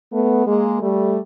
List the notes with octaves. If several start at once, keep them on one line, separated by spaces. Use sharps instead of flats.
A3 B3
G#3 A#3
G3 A3